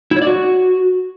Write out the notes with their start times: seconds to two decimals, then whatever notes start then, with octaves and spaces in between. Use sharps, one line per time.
0.11 E4
0.16 C#5
0.22 D5
0.27 F#4